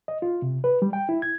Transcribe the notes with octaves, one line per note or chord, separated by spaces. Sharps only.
D#5
F4
C3
B4
G3
G5
E4
G#6